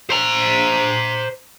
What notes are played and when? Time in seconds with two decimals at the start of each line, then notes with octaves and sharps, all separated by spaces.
0.10 C5 A#5